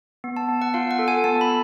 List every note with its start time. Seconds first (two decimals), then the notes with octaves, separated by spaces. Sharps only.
0.24 B3
0.37 A5
0.49 B3
0.62 F#5
0.74 F4 F5
0.91 F#5
0.99 A4
1.08 G#5
1.24 B3 A5
1.41 B5